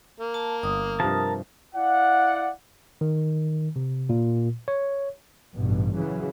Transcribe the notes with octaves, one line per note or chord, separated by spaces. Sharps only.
A#3
A5
G1 D#6
G2 C3 F3 A#4 A5
E4 D5 F5 F#5
D#3
C3
A#2
C#5
A1 G2 B2
C#3 E3 F#3